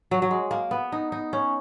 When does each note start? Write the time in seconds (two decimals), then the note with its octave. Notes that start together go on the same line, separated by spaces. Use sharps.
0.11 F#3
0.22 F#3
0.31 G#3
0.51 A#3
0.71 B3
0.92 D#4
1.12 D#4
1.33 C#4